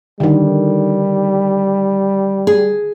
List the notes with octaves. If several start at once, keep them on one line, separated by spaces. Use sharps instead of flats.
D3 D#3 G3
G#4